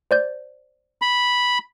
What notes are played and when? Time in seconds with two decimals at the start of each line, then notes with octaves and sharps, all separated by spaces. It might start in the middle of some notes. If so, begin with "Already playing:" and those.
0.11 C5 D5 G6
1.02 B5